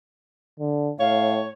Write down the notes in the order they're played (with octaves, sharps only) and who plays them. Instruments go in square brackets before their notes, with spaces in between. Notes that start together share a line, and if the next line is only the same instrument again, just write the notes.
[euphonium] D3
[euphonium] A2 [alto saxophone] C#5 [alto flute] F5